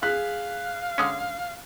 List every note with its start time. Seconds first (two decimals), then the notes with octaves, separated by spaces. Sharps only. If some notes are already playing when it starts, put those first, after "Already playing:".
0.03 G#4 F5 F#6 B6
0.98 D3 G#3 C#4